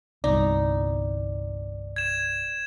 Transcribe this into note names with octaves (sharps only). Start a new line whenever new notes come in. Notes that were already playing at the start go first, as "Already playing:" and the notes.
G1 C2 D#4 D5
G#6 E7